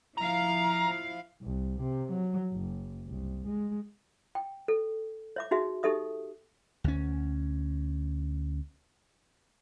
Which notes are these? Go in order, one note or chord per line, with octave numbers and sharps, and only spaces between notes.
F3 E4 F5 A#5
C2
C3
F#3
F#1
C2
G#3
G5
A4
C#5 E5 D6
D#4 F#4 G#4 E5
D#4 G4 A4 E5 D#6
D2 C#4